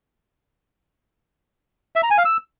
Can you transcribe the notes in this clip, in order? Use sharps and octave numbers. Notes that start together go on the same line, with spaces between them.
E5
A#5
G#5
F5
E6